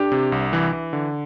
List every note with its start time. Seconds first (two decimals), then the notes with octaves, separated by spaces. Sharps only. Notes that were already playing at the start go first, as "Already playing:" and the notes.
Already playing: D4 G4
0.12 C3
0.32 C2
0.53 E3
0.73 E3
0.93 D3